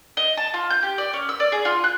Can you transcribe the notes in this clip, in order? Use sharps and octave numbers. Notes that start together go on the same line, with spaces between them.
D#5
A5
F4
G6
G4
D5
C#4
E6
D5
G#4
F4
F#6